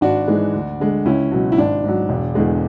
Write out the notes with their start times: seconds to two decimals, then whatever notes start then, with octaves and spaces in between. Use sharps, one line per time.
0.01 G#1 D4 F#4
0.28 G#2 E3 G#3
0.54 D2
0.80 D3 G#3
1.05 C#2 C#4 E4
1.32 B2 F#3
1.52 E4
1.57 G#1 D4
1.84 G#2 F#3
2.09 E1
2.35 E2 D3 G#3